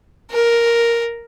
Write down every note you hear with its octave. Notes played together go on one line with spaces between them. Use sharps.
A#4